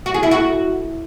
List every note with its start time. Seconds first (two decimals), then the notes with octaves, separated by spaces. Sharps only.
0.06 F#4
0.14 G#4
0.23 E4
0.31 F#4